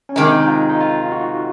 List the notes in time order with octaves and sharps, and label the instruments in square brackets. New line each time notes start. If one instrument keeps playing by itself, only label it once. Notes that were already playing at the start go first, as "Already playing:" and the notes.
[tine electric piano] C#4
[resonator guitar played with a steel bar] C3 D#3 G#3 [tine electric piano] D#4
[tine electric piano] D#4
F4
D#4
F4
F#4